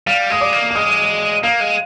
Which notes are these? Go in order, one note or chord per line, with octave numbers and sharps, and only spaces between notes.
G3 F5 F6
G#3 D#6
D5 D6
A#3
F6
G#3 D#5 D#6
A#3 F5 F6
G#3